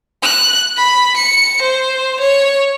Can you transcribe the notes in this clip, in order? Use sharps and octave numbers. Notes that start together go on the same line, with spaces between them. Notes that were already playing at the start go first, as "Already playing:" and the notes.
F#6
B5
C#7
C5
C#5